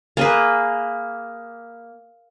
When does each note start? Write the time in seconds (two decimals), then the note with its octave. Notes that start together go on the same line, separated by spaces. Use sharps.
0.17 A#3 G#4 B4